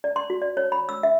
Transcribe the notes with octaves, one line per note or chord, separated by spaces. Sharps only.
D5
C6
F#4
D5
C#5
B5
E6
E5